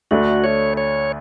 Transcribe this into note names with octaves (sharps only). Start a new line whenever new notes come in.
D2 D3 A3 D4 F#4
C#5
C#5